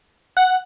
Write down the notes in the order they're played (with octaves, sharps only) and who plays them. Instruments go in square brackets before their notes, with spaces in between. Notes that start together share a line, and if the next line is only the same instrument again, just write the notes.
[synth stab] F#5